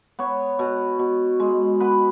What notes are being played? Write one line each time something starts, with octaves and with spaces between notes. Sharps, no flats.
B3 C#5
B2
B2
G#3
B3 B4